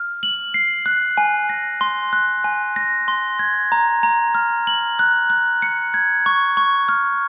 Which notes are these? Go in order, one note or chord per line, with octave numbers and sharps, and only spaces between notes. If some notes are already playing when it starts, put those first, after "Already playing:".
Already playing: F6
F#7
C7
F#6
G#5
A#6
C6
F#6
G#5
A#6
C6
G#6
A#5
A#5
F6
F#7
F#6
F#6
C#7
G#6
C#6
C#6
F6